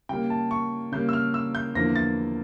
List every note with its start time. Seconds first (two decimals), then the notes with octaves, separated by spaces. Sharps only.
0.09 C#3 G3 A#3 G5
0.30 A5
0.51 C#6
0.92 C#3 G3 A#3 G6
1.09 E6
1.13 F6
1.34 E6
1.55 G6
1.75 E2 D3 F3 A#3 A#6
1.96 A6